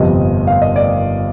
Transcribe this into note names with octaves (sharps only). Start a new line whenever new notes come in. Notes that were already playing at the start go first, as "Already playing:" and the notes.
Already playing: G1 F2 C3 D#5
F5
D#5
D5